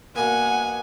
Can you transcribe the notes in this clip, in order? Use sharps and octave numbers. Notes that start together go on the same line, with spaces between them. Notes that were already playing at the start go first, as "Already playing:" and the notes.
B2 A#3 B3 F#5 G#5